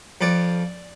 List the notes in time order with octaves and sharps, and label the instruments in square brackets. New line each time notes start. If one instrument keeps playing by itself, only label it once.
[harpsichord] F2 D5